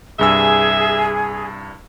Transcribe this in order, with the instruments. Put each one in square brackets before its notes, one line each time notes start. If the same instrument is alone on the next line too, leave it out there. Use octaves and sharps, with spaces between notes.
[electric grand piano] C2 G2 E6 [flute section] G#4 [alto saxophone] E5